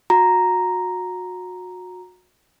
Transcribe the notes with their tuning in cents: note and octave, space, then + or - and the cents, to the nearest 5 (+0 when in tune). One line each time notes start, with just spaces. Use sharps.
F#4 -30 A#5 +0